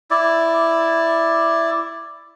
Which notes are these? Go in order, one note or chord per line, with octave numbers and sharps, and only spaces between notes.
E4 D5